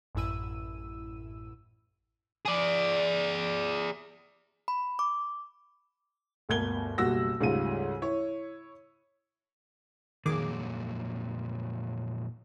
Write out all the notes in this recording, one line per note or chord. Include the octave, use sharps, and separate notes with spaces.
A1 F#2 A2 E4 E6 D#7
G#4 D5
B5
D6
G1 D2 B2 A#4 G#6 G7
F#1 B1 G3 F#4 E6 A#6
D2 G#2 C#3 G3 F4 D#7
E4 C#5
F2 A#2 D#3 F#3 G#4 D6